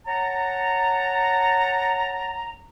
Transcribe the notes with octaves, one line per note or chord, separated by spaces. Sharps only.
C#5 F#5 A5 A#5